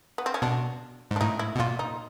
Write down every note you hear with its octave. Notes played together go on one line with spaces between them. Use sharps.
B3
C4
C#4
B2 D4
G#2
D4
A2 D#4
E4
B2
A#2 F4
D#4